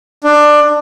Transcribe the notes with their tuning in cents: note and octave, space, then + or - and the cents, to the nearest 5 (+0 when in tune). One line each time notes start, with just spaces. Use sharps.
D4 +15